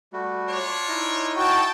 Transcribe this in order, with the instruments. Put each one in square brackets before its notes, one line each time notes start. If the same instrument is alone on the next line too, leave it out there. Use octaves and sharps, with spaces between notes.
[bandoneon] G3 A3 F#4
[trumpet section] D4 F4 C#5
[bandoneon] D#4 E4 D#5
[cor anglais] F#4 [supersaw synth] G5 A5